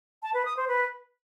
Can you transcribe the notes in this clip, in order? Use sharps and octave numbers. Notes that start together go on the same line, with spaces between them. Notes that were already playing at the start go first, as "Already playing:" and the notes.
A5
B4
D#6
C5
B4